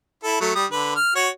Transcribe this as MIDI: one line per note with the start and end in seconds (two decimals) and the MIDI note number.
0.24 0.40 64
0.24 0.40 69
0.41 0.51 54
0.41 0.51 57
0.55 0.66 55
0.55 0.66 87
0.72 0.95 50
0.72 0.95 71
0.96 1.11 89
1.15 1.29 66
1.15 1.29 73